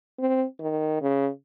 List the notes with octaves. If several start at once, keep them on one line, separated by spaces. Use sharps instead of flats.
C4
D#3
C#3